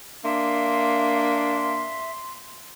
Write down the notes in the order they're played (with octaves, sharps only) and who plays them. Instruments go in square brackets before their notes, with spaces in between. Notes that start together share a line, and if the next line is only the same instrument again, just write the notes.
[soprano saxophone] A#3 [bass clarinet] D4 [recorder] E5 [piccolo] C6